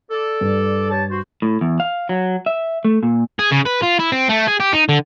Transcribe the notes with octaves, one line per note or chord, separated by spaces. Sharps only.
A4 D5
G2
G4 C#5 A5
F#4 C5
A2
E2
F5
F#3
E5
A3
A#2
G#4
C#3
B4
F4
E4
C4
A3
G#4
G4
D#4
D3